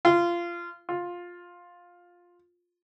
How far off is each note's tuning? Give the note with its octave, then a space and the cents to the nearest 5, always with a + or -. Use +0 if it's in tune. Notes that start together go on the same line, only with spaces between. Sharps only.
F4 -20
F4 +10